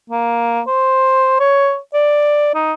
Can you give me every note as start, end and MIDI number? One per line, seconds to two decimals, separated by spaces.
0.10 0.61 58
0.67 1.39 72
1.40 1.77 73
1.94 2.54 74
2.54 2.73 63